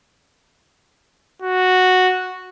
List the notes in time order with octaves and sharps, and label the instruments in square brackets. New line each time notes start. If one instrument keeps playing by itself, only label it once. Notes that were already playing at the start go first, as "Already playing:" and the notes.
[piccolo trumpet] F#4